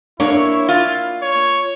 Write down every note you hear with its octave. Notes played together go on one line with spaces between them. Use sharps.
A#3 D4 E4 C#5
F4
C#5